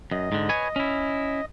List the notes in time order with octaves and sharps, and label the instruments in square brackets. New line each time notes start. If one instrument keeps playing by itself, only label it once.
[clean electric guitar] F#2 [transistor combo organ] D#5
[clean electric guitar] G#2 D3
B4 C#5 G#5
C#4 E4